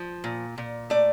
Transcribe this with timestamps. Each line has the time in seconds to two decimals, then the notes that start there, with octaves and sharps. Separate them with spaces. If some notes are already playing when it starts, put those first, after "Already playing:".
Already playing: F3
0.24 A#2
0.58 A#2
0.90 A3 D5